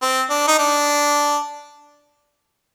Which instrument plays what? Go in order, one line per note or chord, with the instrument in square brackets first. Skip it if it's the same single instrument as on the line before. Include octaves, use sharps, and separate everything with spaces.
[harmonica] C4
D4
D#4
D4